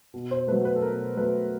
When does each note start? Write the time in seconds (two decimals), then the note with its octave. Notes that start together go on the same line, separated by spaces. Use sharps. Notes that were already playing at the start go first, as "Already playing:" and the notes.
0.14 B2
0.31 C5
0.47 F#3 A3 B4
0.65 B4
0.76 A4
0.82 B2 A#4
1.17 F#3 A3 B4